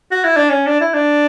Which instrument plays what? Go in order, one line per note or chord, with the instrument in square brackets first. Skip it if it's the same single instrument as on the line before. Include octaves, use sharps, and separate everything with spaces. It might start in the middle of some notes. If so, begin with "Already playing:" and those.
[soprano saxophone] F#4
E4
D4
C#4
D4
E4
D4